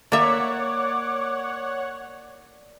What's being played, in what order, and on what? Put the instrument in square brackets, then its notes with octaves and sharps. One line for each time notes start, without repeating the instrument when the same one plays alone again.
[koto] A#3 E5 [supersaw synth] C#5 F#5 [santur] D5 [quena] D6